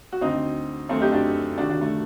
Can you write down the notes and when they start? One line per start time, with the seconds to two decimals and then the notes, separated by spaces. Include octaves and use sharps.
0.12 F#4
0.21 D2 D3 C4 D#4
0.89 F#2 D3 A3 C4
1.01 D#4 G4
1.12 D4 F#4
1.58 D2 C3 D#3 D4 F#4
1.69 D4 F#4
1.81 A3